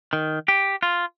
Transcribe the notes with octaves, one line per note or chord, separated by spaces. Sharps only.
D#3
G4
F4